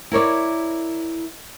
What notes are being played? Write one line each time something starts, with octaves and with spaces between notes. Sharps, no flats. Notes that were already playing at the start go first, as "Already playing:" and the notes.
E4 A#4 C#5 D5